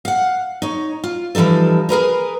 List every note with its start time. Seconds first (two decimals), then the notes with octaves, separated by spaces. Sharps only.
0.05 F5 F#5
0.62 D#4 C#5
1.04 F4
1.35 E3 F3 G3 D#4 A4
1.89 G#4 A#4 B4 A#5